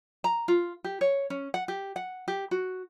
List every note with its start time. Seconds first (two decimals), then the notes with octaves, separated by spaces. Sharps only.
0.24 A#5
0.48 F4
0.84 G4
1.01 C#5
1.30 C#4
1.54 F#5
1.68 G4
1.96 F#5
2.28 G4
2.51 F#4